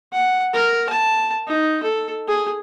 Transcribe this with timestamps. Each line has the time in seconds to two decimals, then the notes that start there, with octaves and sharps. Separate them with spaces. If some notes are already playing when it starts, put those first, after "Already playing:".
0.13 F#5
0.54 A#4
0.89 A5
1.47 D#4
1.83 A4
2.28 G#4